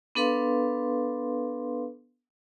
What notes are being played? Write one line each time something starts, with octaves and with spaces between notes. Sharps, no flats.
B3 D4 A4 B4 F5 C6